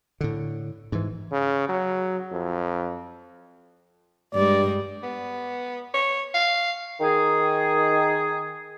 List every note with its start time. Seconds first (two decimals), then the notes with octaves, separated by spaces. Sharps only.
0.21 A2 D3
0.92 G#2 E3
1.31 C#3
1.69 F#3
2.31 F2
4.34 G2 G3 G#3 D5
5.03 B3
5.94 C#5
6.34 F5
7.00 D#3 G#4